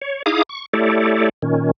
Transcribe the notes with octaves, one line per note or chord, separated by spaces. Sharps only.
C#5
D#4 E4 G#4 F5 D6 D#6
C#6
A3 E4 G4 A4 C#5 D5
A#2 D#3 C#4